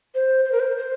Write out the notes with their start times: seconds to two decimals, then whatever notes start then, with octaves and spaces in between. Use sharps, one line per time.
0.15 C5
0.45 C5
0.52 A#4
0.60 C5
0.77 C5